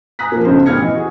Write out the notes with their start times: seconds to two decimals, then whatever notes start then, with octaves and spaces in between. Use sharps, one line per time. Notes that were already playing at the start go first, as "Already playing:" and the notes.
0.19 G#5 A#5 D#6 F#6 B6
0.32 F3 A#3
0.45 B1 C#3 C5
0.66 A1 B3 F6 G#6 C#7
0.78 E3 D#5
0.95 F#4 G#4